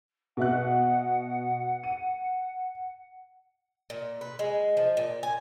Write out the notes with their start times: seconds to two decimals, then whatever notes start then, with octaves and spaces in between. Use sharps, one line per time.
0.37 B2 E5 F#5 F#6
1.84 D#7
3.90 A#2
4.21 B4
4.39 G#3
4.77 F3
4.97 A#2
5.23 G#5